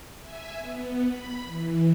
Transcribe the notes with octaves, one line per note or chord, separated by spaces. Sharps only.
E5 G#5
B3
B5
E3